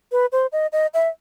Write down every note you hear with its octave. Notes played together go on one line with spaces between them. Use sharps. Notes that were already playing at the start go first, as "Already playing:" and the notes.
B4
C5
D#5
D#5
E5